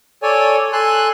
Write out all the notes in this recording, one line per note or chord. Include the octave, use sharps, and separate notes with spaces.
A4 C#5 D5 G#5
A4 G#5 C6 F#6